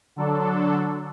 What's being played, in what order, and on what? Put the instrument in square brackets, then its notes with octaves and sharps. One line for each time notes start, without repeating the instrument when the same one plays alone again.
[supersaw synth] D3 F#3 D4 A4